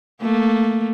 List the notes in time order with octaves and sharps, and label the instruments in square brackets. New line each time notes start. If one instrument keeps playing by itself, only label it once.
[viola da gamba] A3 A#3